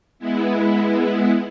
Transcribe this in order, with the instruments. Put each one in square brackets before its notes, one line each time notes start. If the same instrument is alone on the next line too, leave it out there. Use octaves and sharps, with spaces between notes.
[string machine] G#3 B3 E4